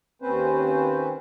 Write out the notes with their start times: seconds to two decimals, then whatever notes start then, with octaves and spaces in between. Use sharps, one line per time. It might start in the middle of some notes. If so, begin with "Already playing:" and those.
0.22 D#2 C4 C#4 B4 C5